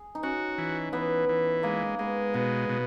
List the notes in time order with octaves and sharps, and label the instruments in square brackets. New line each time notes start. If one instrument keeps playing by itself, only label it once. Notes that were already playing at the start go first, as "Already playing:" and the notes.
Already playing: [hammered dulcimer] G#4
D#4
[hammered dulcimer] C#4 [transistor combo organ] F#4
[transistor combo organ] E3
[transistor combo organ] E3 [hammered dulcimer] B3
[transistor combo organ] E3
[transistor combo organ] G#3 [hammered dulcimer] A#3
[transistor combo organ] G#3 [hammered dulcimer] B3
[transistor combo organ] B2 [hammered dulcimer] B3
[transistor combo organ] B2